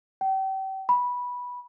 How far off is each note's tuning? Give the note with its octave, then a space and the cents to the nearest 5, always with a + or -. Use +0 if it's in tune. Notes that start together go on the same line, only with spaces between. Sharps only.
G5 -35
B5 -10